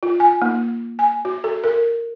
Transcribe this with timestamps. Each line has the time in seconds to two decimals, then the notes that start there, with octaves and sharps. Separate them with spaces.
0.03 F4
0.20 G#5
0.42 A#3
0.99 G#5
1.25 F#4
1.44 A4
1.64 A#4